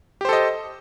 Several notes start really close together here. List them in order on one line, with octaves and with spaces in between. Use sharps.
G4 C5 A4 D#5